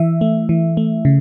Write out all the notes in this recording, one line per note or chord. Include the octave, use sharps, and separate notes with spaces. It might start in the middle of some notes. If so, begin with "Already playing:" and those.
Already playing: E3 E5
A3
E3
A3
C#3